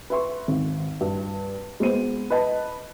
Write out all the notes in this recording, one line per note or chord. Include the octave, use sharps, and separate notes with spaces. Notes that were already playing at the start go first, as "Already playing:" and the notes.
B4 E5 C6 C#6
G#1
G2
G#3 B3 C5 D#7
B4 D#5 A5